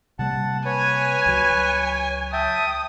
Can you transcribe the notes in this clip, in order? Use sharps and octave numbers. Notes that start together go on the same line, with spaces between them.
C3 G3 A#3 F#5 A5
B4 C#5 G#5
C#2 F#3
E5 G5 A5 D#6